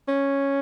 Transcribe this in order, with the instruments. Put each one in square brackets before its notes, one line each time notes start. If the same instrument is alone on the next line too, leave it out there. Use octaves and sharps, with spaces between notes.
[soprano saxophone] C#4